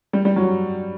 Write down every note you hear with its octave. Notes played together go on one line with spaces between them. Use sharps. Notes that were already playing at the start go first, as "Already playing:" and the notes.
G3
G3
F#3